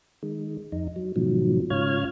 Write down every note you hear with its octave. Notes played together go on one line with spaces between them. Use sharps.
D#3 G#3
F2 D#4
F#3
G#2 B2 D#3 F3 F#3
G#2 C#3 F4 C#5 F6 G#6